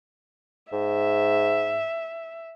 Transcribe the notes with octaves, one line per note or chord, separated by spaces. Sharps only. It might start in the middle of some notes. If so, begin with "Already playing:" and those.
G#2 E5